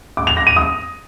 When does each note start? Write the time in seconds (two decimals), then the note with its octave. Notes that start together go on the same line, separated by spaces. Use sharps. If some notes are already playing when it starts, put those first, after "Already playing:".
0.17 D6
0.27 F7
0.37 A#6
0.47 D#7
0.56 D#6